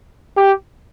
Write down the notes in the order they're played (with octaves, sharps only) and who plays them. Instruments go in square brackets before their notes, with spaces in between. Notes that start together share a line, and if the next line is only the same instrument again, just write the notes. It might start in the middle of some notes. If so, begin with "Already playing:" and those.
[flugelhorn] G4